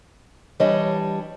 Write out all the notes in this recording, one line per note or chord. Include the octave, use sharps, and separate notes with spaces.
E3 G3 D4 C#5 D#5 A5